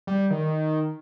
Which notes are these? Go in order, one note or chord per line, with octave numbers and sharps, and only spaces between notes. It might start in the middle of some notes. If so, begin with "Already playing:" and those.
G3
D#3